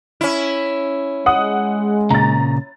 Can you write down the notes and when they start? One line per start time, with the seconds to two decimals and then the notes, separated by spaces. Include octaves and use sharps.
0.21 C#4 E4
1.26 G#3 F#5 D#6
2.10 A#2 C#3 A#5 A6